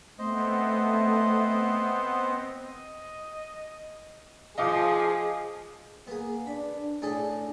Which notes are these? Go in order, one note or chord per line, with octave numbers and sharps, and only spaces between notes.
A3 B3 C4 C5 D#5
D#5
F3 G#4 D#5 F5 D6
A#3 B3 G#4
D4 B5
A2 D4 G#4 A4